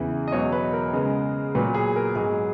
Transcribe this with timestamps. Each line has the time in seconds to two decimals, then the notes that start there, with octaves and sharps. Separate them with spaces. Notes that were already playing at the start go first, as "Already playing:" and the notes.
Already playing: E2 C#3 E3
0.28 D#5
0.32 E2 B2 F#3 C#5
0.53 B4
0.73 A#4
0.93 C#3 G#3 B3
1.55 A#2 F#3 B3 B4
1.75 G#4
1.96 A#4
2.15 G#2 F#3 B3 G#4